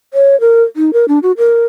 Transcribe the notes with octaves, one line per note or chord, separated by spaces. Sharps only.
C#5
A#4
D#4
A#4
D4
F#4
A#4